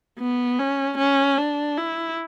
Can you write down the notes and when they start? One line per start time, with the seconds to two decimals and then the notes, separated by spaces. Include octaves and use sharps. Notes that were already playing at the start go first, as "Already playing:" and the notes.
0.19 B3
0.59 C#4
0.98 C#4
1.38 D4
1.77 E4